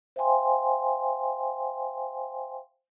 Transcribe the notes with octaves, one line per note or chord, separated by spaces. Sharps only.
C5 E5 F5 G5 G#5 C6